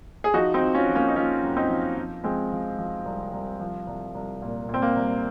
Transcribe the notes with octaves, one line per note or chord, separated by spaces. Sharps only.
G#4
F3 D#4 F#4
C4 D#4
F3
C#4 F4
F3
A#3 C#4
D#4
F3 C#4 F4
F#2
C4 D#4
F3
F3
F3 G#3 C4
F3
F3
C2
C2
F3
C2
C2
A#2
A#2
C4
A#3
C2